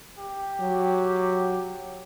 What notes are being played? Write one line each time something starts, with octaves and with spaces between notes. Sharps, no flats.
G4
F#3